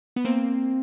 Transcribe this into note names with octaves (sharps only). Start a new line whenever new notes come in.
B3
A#3 C4